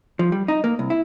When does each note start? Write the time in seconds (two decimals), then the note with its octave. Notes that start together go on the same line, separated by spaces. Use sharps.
0.19 F3
0.32 G3
0.48 D#4
0.64 A#3
0.79 C2
0.90 E4